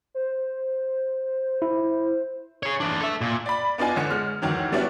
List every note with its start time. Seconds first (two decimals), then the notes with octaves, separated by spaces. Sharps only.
0.14 C5
1.62 E4
2.63 G#4 C#5
2.80 E3 D4
3.01 A4 E5
3.21 A#2
3.46 D5 B5
3.78 B3 D4 D#4 F4 G#5
3.96 A1 D3 C#7
4.10 G#3 F6
4.42 D2 D#3 E3 F#3
4.72 G3 B3 C#4 D4 E4 F#4